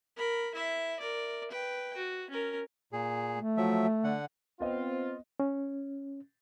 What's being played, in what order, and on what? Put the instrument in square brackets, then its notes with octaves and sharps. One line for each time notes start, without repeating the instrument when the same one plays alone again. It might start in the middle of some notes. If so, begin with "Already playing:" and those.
[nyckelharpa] A#4 B5
E4 E5
A#4 D5
B4 G5
F#4
C#4 A#4
[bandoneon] A#2 G#4
[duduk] A3
[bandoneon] F3 F#3 E5
D3 F#5
[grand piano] B3 D#5 [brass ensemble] C4 F4
[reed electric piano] C#4